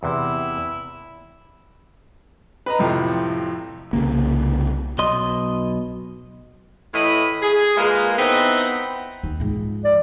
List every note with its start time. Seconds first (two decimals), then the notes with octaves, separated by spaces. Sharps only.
0.03 E2 C3 E4
2.66 B4 D#5 A#5
2.79 F2 A2 C3 F3
3.93 C2 C#3 A#3
4.99 B1 B2 D#5 C6
6.94 A2 E3 D#5 B5
7.42 G#4
7.77 G#3 A#3 F4 A#4 B4
8.18 B3 C4 D#4 E4 F#5
9.23 D#2
9.40 G#2 F3
9.84 D5